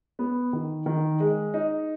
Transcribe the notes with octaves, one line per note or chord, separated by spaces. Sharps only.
B3
D#3
D#3
G#3
D#4